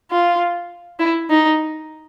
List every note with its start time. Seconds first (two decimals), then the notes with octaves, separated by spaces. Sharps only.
0.11 F4
1.00 E4
1.30 D#4